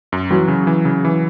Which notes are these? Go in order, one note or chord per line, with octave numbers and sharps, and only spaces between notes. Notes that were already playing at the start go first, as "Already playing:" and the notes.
F#2
E3 F#3
C#3
E3
C#3
E3